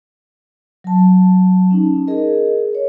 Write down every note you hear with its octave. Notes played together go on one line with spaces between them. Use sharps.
F#3 A5
C#4 D#4
G#4 A#4 D#5
A#4 C#5